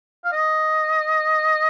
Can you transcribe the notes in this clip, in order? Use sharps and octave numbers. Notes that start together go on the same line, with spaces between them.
F5
D#5